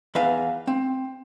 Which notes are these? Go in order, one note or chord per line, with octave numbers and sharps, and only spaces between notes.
E2 B4 E5 F5
C4